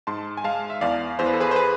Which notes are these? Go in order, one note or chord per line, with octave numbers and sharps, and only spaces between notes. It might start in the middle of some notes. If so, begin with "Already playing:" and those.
G#2 A5 C6
G#5
G#3 F5 A5
E5
E2 D5 F5
E2 C5
B4
A4
G#4 B4
C5
G#4 B4